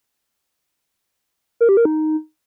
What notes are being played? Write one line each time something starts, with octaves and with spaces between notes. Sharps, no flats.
A#4
G4
A#4
D#4